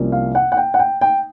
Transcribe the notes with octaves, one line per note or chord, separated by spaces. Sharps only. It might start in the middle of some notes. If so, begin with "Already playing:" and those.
Already playing: C2 C3 F3 A#3 C#4
F5
F#5
F#5
G5
F#5
G5
G5